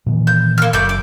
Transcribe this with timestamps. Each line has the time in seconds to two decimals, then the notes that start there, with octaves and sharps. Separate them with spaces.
0.06 A#2 D#3 E3
0.27 G6
0.58 A#3 F6
0.73 F#1 A3 D6 G6
0.89 D6